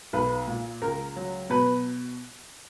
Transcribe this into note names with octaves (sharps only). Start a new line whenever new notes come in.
B1 B4
A#2
C#2 A#4
F#3
B2 B4